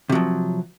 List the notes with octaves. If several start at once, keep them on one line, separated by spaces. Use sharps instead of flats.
C3 F3 F#3